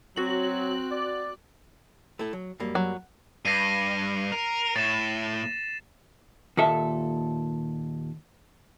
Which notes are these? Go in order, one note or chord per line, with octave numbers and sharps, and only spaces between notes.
F#3 C4 F#4 F#7
D5
A3 E4 A4
F#3
F#2 G3 A#3
F#3
G2 A#6 C7 D#7
A#4
A2 A6 E7
D#2 A#2 A4 E5